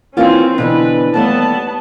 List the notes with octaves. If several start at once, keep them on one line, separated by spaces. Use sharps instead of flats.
E3 A#3 C4 C#4 F4
B2 D3 E3 B4
D#2 G3 A3 B3 A5